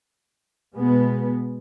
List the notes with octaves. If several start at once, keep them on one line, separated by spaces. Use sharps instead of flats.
B2 G#3 B3